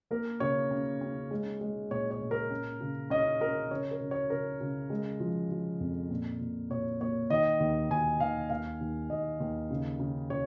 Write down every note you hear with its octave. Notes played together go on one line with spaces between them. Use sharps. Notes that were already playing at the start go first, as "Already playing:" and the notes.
A#3 A#4
C#3 C#5
C#4
C#4
G#3
G#3
A#2 C#5
C#5
A#2
A#4
C#4
C#3
C#4 D#5
C#4 A#4
C#3 C#5
A#4
C#3
C#5
C#3 A#4
C#3
G#3
F3
F3
F2
A#2
A#2
A#2 C#5
A#3 C#5
D#3 D#5
D#2
D#2 G#5
D#2 F5
D#2 F5
D#2
D#2 D#5
D#2
C#3
C#3
C#3 C#5